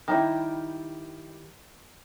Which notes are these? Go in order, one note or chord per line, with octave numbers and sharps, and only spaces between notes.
D#3 G3 E4